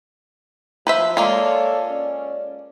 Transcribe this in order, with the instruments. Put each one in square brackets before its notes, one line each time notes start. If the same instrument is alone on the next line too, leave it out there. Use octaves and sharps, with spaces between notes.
[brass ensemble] F3 [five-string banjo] B4 C5 E5
[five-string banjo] G#3 A#3 F4 [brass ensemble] A4 C#5 D5
[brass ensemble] C#4 D5